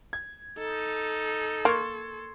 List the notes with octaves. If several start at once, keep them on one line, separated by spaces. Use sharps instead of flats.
G#6
D#4 A4
A#3 C6 C#6 G#6